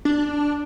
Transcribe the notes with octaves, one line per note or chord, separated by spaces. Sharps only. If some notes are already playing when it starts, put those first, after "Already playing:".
D4